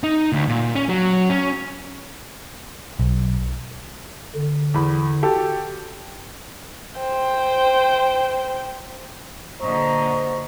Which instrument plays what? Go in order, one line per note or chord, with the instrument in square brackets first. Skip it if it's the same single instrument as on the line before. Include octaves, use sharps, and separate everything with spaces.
[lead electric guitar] D#4
D2
A#2
C#4
F#3
C#4
[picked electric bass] B1
[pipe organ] D3
[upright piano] E2 B5
F#4 G4 A4
[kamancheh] C5 G5
[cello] A#2 D3 [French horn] C5 [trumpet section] D#5 A#5 [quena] C#6